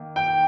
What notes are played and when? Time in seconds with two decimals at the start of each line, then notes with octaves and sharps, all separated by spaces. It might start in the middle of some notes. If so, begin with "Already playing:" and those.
Already playing: D#3 A#3
0.16 G5